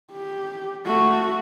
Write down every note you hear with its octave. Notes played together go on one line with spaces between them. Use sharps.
G4
A3 F#4